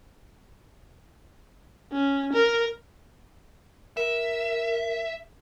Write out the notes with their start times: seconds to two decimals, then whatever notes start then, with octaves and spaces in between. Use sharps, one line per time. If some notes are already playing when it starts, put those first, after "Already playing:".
1.93 C#4
2.33 A#4
3.97 A#4 E5